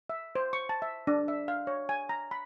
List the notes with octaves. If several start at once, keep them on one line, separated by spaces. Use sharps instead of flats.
E5
C5
C#6
A5
E5
D4
E5
F5
C#5
G#5
A#5
B5